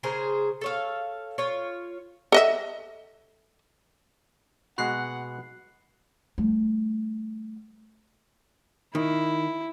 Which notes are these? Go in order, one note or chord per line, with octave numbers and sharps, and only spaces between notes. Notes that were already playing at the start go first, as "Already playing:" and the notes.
C#3 G#4 A#4 C5
A4 C#5 F5
F4 C#5
A4 D#5 E5
B2 G#3 F#4 F#5 B5 F#6 C7
G3 A3
D#3 E4